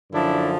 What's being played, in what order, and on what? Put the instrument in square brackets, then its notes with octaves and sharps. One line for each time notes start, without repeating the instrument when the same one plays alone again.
[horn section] F#2 D3 F3 D4 E4